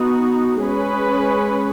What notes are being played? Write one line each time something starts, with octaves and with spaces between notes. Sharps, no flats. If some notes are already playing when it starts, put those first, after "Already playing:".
Already playing: B3 D#4 F#4
G#3 C#4 G#4 B4